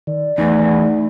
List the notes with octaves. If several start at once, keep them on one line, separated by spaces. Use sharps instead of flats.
D#3 D5
E2 A3 D#4